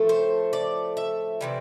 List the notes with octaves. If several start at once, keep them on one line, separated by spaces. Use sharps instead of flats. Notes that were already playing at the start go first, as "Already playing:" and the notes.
Already playing: A2 F3 A3
C5
D5
E5
C3 E3 G3